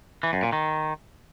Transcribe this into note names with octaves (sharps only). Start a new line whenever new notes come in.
E3
F#2
A#2
D#3